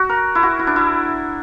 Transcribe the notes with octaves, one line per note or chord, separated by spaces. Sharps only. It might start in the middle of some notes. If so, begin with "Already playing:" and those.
Already playing: F#4
A#4
E4
F#4
E4
D4
E4